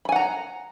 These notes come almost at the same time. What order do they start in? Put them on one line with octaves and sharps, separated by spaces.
B5 G#5 F#5 A#5